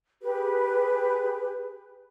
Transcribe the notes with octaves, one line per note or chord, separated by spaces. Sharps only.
G4 G#4 B4